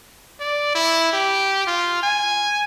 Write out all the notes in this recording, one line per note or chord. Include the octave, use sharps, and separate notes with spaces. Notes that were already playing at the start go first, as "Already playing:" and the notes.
D5
E4
G4
F4
G#5